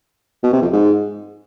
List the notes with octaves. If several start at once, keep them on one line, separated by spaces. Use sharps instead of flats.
B2
C3
F2
G#2